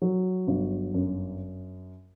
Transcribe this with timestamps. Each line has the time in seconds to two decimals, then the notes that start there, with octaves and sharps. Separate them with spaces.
0.02 F#3
0.47 G1
0.94 F#2